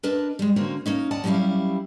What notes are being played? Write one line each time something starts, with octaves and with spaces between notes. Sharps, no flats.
D4 A#4 B4 D#5 A5
G3 G#3
D3 A#3 C4 C#4 F#4 A#4
A#3 C#4 D#4
D#2 D5 D#5 F#5 A5
F#3 G3 C#4 E4 G4 F5